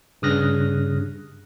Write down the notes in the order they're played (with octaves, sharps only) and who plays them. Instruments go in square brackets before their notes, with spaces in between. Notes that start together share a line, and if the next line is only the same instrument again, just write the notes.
[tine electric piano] G2 C#3 D#6 F6 F#6 A#6